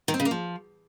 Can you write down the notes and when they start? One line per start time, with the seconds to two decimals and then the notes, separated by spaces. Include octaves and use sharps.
0.08 D#3
0.14 C4
0.20 C#3
0.25 A#3
0.31 F3